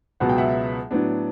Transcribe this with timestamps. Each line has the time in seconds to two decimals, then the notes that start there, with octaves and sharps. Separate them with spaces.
0.20 C#2 B2 F#3 B3 F#5
0.29 G5
0.38 E5 F#5
0.91 A2 F#3 B3 D4